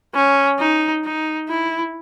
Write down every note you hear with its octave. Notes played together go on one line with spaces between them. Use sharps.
C#4
D#4
D#4
E4